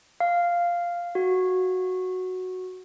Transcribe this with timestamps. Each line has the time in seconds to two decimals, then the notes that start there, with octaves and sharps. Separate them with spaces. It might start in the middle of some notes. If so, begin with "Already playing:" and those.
0.20 F5
1.15 F#4